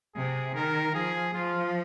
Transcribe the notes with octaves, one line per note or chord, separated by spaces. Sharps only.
C3 G#4
D#3 A#4
F3 G#4
F3 F4